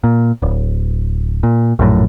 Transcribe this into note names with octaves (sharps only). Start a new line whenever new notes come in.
A#2
D1
A#2
A#1 F#2 A2